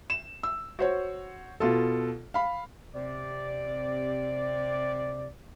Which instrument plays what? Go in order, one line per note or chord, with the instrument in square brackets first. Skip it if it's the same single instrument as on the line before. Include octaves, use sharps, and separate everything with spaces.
[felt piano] E7
E6
F#4 C5 C#5
B2 F4 A4
F5 B5
[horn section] C3 D5